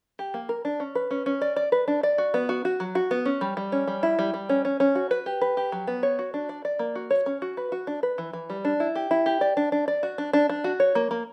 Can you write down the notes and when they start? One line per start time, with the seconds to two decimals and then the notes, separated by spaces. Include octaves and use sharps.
0.19 G4
0.34 A#3
0.49 A#4
0.65 D4
0.80 C#4
0.95 B4
1.11 C#4
1.26 C#4
1.42 D5
1.56 D5
1.72 B4
1.88 D4
2.03 D5
2.18 F#4
2.34 B3
2.49 F#4
2.65 F#4
2.80 F#3
2.95 F#4
3.11 B3
3.25 C#4
3.41 G3
3.57 G3
3.72 C#4
3.87 G3
4.03 E4
4.19 G3
4.34 G3
4.49 C#4
4.65 C#4
4.80 C#4
4.95 F#4
5.11 B4
5.26 G4
5.41 B4
5.57 G4
5.72 F#3
5.87 B3
6.03 C#5
6.19 F#4
6.34 D4
6.49 D5
6.65 D5
6.79 A#3
6.95 F#4
7.11 C#5
7.26 C#4
7.42 F#4
7.57 B4
7.72 F#4
7.87 D4
8.03 B4
8.18 E3
8.33 E3
8.50 G3
8.65 D4
8.80 E4
8.95 G4
9.11 E4
9.26 G4
9.41 D5
9.57 D4
9.72 D4
9.88 D5
10.03 F#4
10.18 D4
10.33 D4
10.49 D4
10.64 F#4
10.80 C#5
10.95 A#3
11.11 A#3